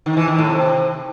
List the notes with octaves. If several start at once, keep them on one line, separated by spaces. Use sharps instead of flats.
D#3
E3
D#3
A2
C3